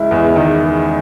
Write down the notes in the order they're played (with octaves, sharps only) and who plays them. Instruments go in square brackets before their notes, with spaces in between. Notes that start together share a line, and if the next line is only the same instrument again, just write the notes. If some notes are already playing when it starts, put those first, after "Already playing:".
Already playing: [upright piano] C#2 [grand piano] E4
[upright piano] E2
D#3